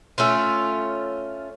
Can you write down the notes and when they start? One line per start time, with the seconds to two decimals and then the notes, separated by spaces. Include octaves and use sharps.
0.18 A3 C#4 F4